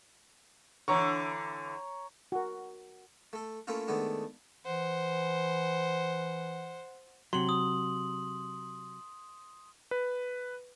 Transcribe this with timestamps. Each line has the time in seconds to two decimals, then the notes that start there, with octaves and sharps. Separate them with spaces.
0.88 D3 E3 C#5 A#5 C#6
2.32 F#4 A#4
3.33 A3 A4
3.67 A3 A#3 C#4 E4 F4
3.88 D#3 G#3 A3 B3 D4
4.65 E3 C5 F#5
7.33 C3 F#3 C6 F#7
7.49 D#6
9.91 B4